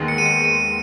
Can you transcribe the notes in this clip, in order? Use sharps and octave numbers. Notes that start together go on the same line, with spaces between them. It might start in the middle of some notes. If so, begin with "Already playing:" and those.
Already playing: D#2 D#3 G#3 B3
C#7
D#7
C#7
D#7